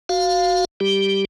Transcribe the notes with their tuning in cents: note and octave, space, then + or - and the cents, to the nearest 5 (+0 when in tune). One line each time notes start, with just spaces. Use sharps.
F#4 +0 F5 +0
G3 +0 G4 +0